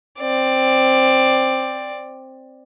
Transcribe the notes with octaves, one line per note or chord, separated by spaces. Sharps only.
C4 D5